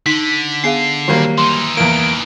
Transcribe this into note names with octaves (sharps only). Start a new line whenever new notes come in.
D3 D#4 B6
B3 G#4 F5 C7
D#3 F#3 G3 A#3
E3 D#4 C6
E2 A#3 D7